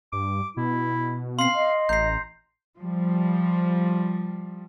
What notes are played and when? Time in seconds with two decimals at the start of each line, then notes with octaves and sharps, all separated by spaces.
0.13 G2 D6
0.57 B2 E4
1.39 C4 F5 C6 C7
1.55 D#5
1.89 A1 A#5 G6 C7
2.78 F3 G3